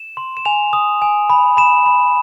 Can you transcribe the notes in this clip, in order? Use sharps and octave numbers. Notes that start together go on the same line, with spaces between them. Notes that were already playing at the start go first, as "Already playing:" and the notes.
Already playing: E7
C6
E7
G#5 F7
D#6
G#5
B5
B5 E7
B5